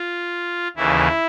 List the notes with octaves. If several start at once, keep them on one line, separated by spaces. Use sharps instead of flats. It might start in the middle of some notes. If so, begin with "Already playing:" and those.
Already playing: F4
D#2 C#3 E3 E4